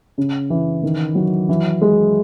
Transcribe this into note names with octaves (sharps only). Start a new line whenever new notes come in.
C#3
E3
D#3
F#3
E3
G#3